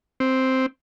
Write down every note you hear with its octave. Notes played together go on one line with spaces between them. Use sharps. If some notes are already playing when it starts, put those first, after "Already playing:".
C4